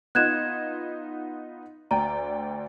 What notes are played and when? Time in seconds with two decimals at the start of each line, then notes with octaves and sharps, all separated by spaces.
0.15 B3 D#4 F4 F#6 G#6 E7
1.91 D2 D5 G5 A#5